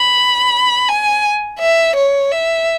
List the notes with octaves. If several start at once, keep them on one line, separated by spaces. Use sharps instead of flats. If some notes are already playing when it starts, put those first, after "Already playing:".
Already playing: B5
G#5
E5
C#5
E5